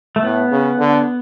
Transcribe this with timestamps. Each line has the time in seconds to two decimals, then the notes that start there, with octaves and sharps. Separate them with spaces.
0.16 A3
0.23 A2 B3
0.51 C#3
0.79 D3